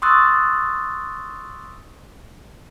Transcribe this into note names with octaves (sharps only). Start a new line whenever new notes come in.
C6 C#6 D#6 E6 F#6 A6